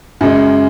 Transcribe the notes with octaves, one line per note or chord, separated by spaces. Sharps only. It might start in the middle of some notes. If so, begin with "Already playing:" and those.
F#2 C#3 G#3